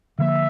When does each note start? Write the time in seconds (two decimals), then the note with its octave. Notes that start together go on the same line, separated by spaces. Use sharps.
0.19 D3 F3 A#3 E5